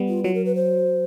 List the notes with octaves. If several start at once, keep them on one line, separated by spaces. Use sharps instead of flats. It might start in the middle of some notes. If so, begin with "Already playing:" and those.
Already playing: G3 B3
F4
F#3 F4
A#4
B4
C5